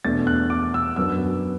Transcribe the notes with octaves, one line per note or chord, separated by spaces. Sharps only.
E2 B2 A3 D4 A6
F#6
D6
E6
F#2 F#3 B3 D4 E6